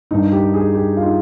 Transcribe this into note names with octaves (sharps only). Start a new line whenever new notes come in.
G2 D#3 D#4
G4
G#4
G4
F4
D#4